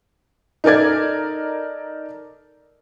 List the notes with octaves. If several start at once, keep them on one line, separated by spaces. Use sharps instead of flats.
D#4 A4 A#4 D5 G#6